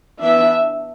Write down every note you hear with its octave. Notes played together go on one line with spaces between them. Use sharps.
E3 B3 D4 E5